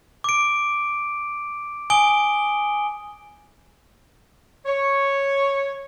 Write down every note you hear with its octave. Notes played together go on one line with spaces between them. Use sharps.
D6 D7
G#5 D#6 D7 G7
C#5